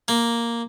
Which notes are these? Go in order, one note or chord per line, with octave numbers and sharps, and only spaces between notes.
A#3